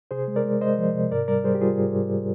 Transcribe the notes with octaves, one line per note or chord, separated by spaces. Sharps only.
C3 G#4 C5
G#3
A#4 D5
G#3
G#3 C5 D#5
F3
C3
G#2 A#4 D5
G3 A#4 D5
G3 G#4 C5
G4
G3 F4 G#4
G#2
G#2